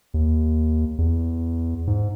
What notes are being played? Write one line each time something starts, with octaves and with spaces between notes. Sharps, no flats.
D#2
E2
G#2